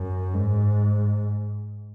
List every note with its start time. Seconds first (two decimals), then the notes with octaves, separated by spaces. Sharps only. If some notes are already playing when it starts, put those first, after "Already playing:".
Already playing: F#2
0.34 G#2